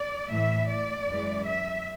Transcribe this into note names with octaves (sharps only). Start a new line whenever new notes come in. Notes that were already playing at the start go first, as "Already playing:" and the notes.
Already playing: D5
A2 E3 A3 E5
D5
F#2 E3 G#3
E5